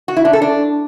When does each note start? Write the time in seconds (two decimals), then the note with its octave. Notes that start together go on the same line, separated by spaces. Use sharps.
0.08 F#4
0.16 E4
0.25 D4
0.33 A4
0.42 D4